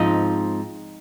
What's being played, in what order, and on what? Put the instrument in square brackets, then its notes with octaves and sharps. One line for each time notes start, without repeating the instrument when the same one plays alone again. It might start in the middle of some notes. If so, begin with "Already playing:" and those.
Already playing: [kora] G#2 F3 C4 D#4 D#5